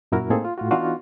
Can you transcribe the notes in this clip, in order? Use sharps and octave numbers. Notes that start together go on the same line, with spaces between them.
F#2 A#2 E4 F#4 A#4
A2 A#3 C4 D#4 G#4 A4
F4
A2 F4 F#4
E3 B3 D4 D#4 F4 F#4